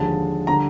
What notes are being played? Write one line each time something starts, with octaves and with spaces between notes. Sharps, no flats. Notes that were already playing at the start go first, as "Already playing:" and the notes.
Already playing: D#2 D3 F3 G#3 A5
D3 G3 A#5